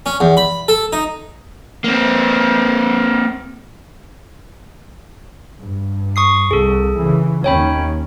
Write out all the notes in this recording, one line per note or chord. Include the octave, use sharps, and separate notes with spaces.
C#4
E2
B5
A4
D#4
A#3 C4
G2
C#6 D#6 C7
C2 G#4 A4
C#3 E3
D#2 D#3 C#4 C#5 G5 B5